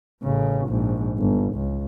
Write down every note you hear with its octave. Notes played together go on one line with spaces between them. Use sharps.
A1 C#3
A#1 G#2
G1
C#2